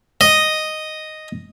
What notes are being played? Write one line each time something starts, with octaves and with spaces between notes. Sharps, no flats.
D#5